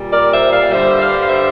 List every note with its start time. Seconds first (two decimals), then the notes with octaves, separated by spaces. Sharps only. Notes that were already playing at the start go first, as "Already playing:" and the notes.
Already playing: A#2 G3
0.13 A#4 D5
0.33 C5 E5
0.52 D5 F5
0.71 G2 D3 G3 C5 E5
1.01 D5 F5
1.19 F5
1.29 C5 E5